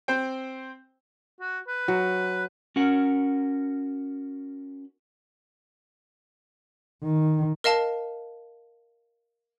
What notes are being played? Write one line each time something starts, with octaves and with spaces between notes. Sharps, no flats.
C4 C5 G5
F#4
B4
F#3
C#4 F#4 A#4 F#5
D#3
A#4 D#5 F5 A5